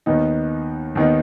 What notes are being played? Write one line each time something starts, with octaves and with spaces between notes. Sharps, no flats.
D#2 D#3 B3 D#4
D#2 D#3 B3 D#4